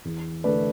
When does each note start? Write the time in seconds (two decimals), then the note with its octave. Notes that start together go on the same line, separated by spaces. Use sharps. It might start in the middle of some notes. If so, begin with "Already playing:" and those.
0.05 E2
0.44 D3 A3 B4 D5